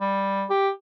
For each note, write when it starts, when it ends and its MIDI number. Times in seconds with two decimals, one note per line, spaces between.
0.01 0.45 55
0.50 0.70 67